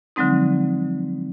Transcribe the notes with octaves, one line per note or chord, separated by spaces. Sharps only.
D3 F3 F#3 G#3 C4 D#4